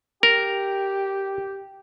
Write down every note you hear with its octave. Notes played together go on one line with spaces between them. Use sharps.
G4 A#4